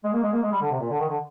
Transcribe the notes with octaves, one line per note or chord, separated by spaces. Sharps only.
G#3
A#3
G#3
A#3
G#3
G3
D3
C3
A#2
D3
D#3
D3